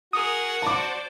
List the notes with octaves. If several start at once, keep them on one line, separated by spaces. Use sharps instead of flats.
F#4 G#4 A#4 D#6
C5 D5 A5 D6